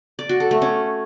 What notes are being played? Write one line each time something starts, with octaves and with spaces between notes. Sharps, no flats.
D5
F#4
A4
A3
C#4